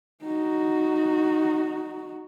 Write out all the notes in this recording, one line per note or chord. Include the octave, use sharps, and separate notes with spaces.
D#4 F#4